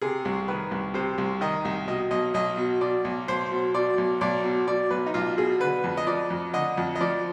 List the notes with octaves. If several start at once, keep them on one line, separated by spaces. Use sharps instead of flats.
C3 G#4
C2
D#3 B4
C2
C3 C5
C2
D#3 D#5
C2
B2 D#5
B1 D#5
B1 D#5
B2
B2 D5
B1
B1 C5
B2
B2 D5
B1
B1 D5
B2
B2 D5
B1 B4
D#4
B1 F4
B2 G#4
D3 B4
F2
D#5
F3 D5
F2
D3 D#5
F2
D#5
F3 D5